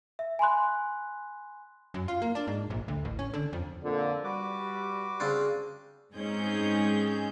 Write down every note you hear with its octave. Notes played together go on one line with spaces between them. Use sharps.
E5
G#5 B5 C6 F#6
F#2
F4
A#3
D4
G#2
A#1
D2
A1
C#4
D3
F2
F2 A#2 D3
G3 F#4 B4 D6
C#3 C4 D4
G#2 C4 C#4 D#4 G#4 G6